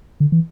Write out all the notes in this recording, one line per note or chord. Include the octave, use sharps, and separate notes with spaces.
D3
E3